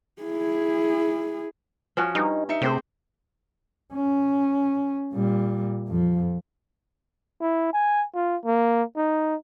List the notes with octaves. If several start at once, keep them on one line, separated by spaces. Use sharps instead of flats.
E4 G#4
F3 C#4 F#4
G2 D#4
D#4 E5 C#7
C3 A3 C4 G4 G#4 C5
C#4
A#2 G3
F2 F3
E4
G#5
F4
A#3
D#4